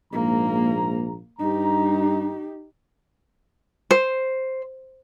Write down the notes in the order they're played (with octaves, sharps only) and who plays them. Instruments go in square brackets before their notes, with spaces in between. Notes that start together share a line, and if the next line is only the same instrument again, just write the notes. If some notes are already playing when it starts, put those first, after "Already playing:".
[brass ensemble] A#1 G#2 A#5 [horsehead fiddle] A#3
[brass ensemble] G2 A#5 [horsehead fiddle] D#4 G4
[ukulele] C5